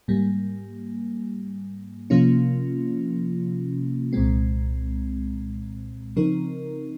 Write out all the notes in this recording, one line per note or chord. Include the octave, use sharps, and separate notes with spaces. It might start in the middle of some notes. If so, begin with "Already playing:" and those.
G#2 G3 A#3
C3 F3 A#3 C#4 F4
C2 A#2 G#3 C4
C#3 F3 C4 D#4 A#4